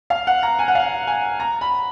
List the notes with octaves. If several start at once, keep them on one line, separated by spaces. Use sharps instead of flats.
F5
F#5
A#5
G#5
F#5
F5
G#5
A#5
B5